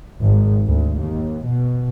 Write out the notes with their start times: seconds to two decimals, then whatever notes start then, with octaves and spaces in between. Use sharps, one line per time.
0.21 G#1
0.67 D2
0.97 D#2
1.45 B2